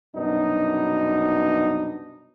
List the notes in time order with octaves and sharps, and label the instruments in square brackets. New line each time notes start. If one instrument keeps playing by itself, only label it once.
[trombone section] C2 F#2 B2 B3 D4 D#4